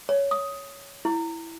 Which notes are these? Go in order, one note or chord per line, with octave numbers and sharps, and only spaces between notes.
C#5
D#6
E4